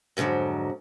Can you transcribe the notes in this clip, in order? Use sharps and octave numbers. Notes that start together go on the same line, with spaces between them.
F2 G#2 B2 D3 F#3